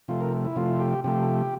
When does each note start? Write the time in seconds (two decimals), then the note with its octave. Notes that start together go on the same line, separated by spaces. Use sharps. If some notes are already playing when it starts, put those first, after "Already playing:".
0.08 C3 F3 A3 F4
0.21 A#4
0.45 E4
0.56 C3 F3 A3 F4
0.80 G4
1.04 C3 F3 A3 G4